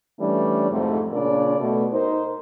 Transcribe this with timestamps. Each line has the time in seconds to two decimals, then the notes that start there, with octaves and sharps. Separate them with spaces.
0.20 E3 G3 A3 C#4 D4
0.70 F2 G#2 C3 A3
1.12 A#2 C#3 D4 A#4 D5
1.59 B2 A3
1.93 D#4 A#4 C5